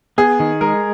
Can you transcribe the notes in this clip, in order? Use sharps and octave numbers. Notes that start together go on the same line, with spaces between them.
B3 G#4
D#3
G#3 A#4